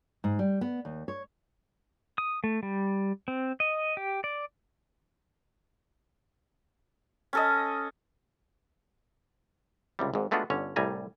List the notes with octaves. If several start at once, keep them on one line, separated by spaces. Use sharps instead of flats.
G#2
G3
B3
D#2
C#5
D#6
A3
G3
C4
D#5
G4
D5
C#4 A4 D#5
C#2 C3 G3
G#1 G#2
G#3 A3 B3 D4 F4 F#4
G1 D3 C#4 C#5
C2 A2 G3 G#5 A#5